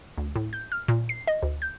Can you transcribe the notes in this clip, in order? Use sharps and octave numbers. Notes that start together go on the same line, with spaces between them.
D2
A2
G6
F6
A#2
C7
D#5
D2
G6